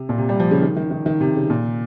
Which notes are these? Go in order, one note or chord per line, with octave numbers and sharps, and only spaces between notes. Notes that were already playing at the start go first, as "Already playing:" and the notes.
Already playing: C3
A#2
C3
G3
F3
C#3
D#3
D#3
D#3
D#3
C3
C#3
A#2